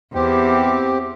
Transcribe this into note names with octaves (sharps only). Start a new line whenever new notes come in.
E2 C4 G4